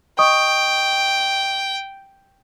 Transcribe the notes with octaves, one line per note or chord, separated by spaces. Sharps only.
D#5 G5 C#6 D#6